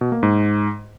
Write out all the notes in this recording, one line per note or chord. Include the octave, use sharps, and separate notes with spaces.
B2
A#3
G#2